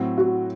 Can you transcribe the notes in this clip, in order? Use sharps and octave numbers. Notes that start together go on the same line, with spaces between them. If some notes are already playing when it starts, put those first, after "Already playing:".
Already playing: A2 F#3 C4
F#4